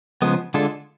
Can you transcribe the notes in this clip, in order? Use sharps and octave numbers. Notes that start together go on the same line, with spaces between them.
C#3 F3 G#3 B3
D3 G#3 D4 F4 A4